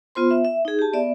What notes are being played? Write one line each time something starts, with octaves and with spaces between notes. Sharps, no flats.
B3 F4 C5 C6
E5
E5
D#4 G#4
G4 A5
B3 D5 E5